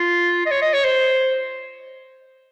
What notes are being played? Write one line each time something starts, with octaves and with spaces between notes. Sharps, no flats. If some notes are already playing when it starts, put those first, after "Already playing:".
Already playing: F4
D#5
C#5
D#5
C#5
C5